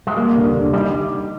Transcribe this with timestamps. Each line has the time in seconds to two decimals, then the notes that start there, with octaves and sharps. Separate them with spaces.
0.07 G#3
0.16 G3 A#3
0.35 D3
0.54 D3
0.73 G3 D#4